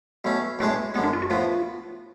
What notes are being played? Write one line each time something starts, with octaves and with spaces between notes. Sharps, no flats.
B1 B2 A3 C#4
B1 A2 G#3 A3 D4 G#4
F#2 D3 G#3 B3
D4
F4
F#4
A2 F3 B3 F4